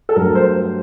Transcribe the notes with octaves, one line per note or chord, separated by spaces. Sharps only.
A4
G2 F#3 A3 A#4
C5